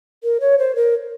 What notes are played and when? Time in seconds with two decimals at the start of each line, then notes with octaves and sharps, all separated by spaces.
0.23 A#4
0.40 C#5
0.58 C5
0.75 A#4